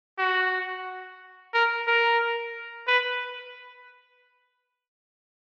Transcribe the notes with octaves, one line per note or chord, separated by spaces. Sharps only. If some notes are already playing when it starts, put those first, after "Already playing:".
F#4
A#4
A#4
B4